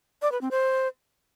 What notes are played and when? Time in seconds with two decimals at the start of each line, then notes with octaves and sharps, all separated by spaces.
0.22 D5
0.32 B4
0.41 C4
0.51 C5